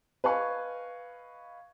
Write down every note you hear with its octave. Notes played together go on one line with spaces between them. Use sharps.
B4 D#5 F5 G#5 C#6